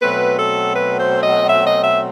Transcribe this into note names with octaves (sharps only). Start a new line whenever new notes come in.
B2 F#3 A3 C4 B4
A4
B4
C5
D#5
E5
D#5
E5